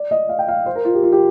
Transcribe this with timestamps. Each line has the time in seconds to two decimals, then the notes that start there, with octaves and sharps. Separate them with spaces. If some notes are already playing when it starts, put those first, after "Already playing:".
Already playing: D5
0.11 D#5
0.29 F5
0.39 G5
0.48 F5
0.66 C5
0.76 A#4
0.85 F4
0.95 G4
1.03 F4
1.12 G4